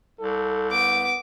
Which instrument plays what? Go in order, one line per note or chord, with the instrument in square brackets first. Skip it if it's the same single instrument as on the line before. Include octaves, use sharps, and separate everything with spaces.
[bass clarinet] C2 [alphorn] A4
[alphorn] B3 [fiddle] D6